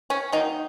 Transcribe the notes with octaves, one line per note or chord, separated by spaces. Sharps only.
C#4
D#3 F#3 A#3 D#4